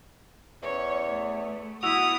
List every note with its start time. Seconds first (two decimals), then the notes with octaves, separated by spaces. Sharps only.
0.62 E2 C#4 C#5
1.09 A3
1.83 B3 E4 F#4 D#6 E6 F7